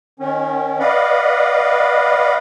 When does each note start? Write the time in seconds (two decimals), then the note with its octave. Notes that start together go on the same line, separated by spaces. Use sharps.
0.20 D#3 C#4
0.80 B4 D5 D#5 F5 F#5 B5